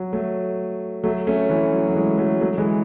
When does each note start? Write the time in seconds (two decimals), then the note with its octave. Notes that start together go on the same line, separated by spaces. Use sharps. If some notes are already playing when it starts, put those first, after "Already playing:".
Already playing: F#3
0.13 F#3 A3
1.04 F#3 A3
1.27 A3 C#4
1.50 E3
1.72 F#3
1.88 F#3
1.95 E3 G#3
2.18 F#3 A3
2.41 F#3 A3
2.58 E3 G#3